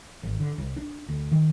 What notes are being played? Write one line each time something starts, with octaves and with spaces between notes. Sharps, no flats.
G#1
D3
C2
D4
D2
D#3